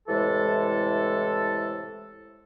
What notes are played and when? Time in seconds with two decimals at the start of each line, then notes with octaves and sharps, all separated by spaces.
0.08 A2 C3 E3 G#3 A4